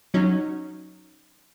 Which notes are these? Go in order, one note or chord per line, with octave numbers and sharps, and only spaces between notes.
F#3 C#4 D#4